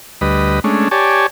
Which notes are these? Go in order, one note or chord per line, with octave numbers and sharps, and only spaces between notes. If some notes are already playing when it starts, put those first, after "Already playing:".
D2 G3 B4 D#5
G#3 A3 C#4 D4
G4 C#5 D5 G#5 A5